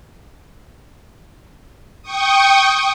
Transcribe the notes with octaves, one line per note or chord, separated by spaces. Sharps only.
G5 C#6 D#6